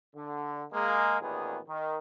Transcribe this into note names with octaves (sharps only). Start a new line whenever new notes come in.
D3
G#3 A#3
A1 E2 A#2 D#3 B3 G#4
D#3